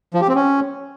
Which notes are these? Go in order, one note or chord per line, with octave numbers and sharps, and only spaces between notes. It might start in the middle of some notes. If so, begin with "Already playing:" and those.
F3
G4
C4
C#4